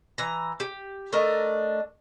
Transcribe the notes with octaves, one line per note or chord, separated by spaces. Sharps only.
E3 A#5
G4
A3 D4 A#4 D#5